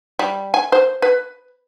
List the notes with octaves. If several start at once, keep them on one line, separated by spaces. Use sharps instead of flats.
G3
G#5
C5
B4